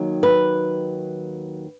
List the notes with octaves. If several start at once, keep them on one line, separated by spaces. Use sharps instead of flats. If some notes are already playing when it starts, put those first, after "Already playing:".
Already playing: D#2 D#3 F#3
B4